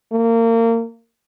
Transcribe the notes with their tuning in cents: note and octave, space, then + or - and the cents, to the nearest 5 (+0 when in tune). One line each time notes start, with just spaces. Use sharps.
A#3 -30